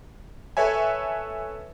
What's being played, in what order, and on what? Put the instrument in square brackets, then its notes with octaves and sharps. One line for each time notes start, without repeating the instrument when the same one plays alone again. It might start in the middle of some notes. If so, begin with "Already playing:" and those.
[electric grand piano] A4 B4 C#5 E5 G#5